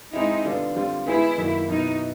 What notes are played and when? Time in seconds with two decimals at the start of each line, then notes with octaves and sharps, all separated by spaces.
0.13 G#3 C4 D#4 E4
0.45 D3 G3 B3 D4 F4
0.76 D3 G3 C4 F4
1.06 G#3 B3 D#4 E4 G#4
1.38 F#2 D#3 F#3 A#3
1.68 B2 F#3 B3 D#4 E4